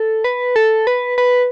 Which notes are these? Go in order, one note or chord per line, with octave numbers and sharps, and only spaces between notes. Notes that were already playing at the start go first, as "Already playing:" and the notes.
Already playing: A4
B4
A4
B4
B4